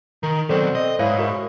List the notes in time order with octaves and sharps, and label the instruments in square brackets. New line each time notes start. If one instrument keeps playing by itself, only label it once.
[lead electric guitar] D#3 [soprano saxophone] A#4
[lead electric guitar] B2 F#3 [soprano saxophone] C4 [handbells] A4 C5 D5
[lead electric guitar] D#5
[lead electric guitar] G#2 [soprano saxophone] E4 [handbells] B4 C#5 F5
[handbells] F#4 A#4 [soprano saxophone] C#5